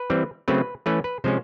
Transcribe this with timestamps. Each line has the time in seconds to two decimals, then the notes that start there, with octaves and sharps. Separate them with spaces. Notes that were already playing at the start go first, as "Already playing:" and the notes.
Already playing: B4
0.10 E3 G3 C4
0.48 C#3 F#3 A3 C4 B4
0.86 E3 A3 C#4 B4
1.04 B4
1.24 C3 F3 G#3 C#4 C5